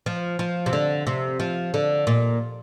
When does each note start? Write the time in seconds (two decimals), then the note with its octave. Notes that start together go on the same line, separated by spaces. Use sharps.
0.06 F3
0.39 F3
0.66 C3
0.73 D3
1.07 C3
1.40 F3
1.74 D3
2.07 A#2